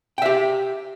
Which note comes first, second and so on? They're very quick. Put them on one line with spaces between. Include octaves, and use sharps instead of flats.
G5 E5 G4